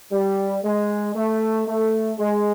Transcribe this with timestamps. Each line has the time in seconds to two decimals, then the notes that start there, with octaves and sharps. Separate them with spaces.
0.12 G3
0.63 G#3
1.15 A3
1.67 A3
2.18 G#3